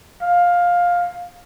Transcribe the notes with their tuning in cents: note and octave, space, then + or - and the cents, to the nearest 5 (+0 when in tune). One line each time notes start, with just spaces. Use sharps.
F5 +10